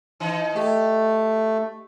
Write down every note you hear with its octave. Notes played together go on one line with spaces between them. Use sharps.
E3 D#4
A3 G4